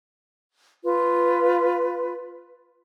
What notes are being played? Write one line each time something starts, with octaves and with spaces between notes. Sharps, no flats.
F4 B4